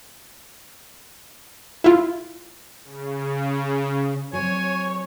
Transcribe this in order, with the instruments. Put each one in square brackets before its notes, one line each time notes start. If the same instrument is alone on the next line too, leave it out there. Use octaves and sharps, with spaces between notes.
[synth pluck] E4 F4
[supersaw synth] C#3
[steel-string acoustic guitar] F#3 C4 [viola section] C#5 [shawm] G#5